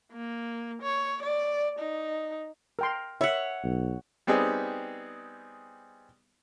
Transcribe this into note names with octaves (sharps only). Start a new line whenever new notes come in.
A#3
C#5
D5
D#4
A#4 G5 C6
C#5 E5 F#5
B1
G3 B3 C4 D#4 G#4